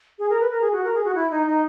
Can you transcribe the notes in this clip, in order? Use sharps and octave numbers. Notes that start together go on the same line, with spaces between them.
G#4
A#4
B4
A#4
G#4
F#4
A#4
G#4
F#4
E4
D#4
D#4